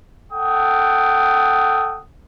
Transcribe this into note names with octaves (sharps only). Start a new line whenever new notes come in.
A4 F#5 G5 D#6